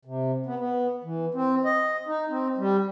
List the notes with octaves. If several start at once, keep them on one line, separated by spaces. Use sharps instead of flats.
C3
B3
B3
E3
C4
D#5
D#4
C4
G3